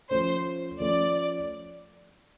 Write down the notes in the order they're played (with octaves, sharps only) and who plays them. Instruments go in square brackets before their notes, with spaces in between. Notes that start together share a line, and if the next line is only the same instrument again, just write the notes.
[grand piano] F3 A3 C#4 [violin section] C5
[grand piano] F3 A3 C#4 [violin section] D5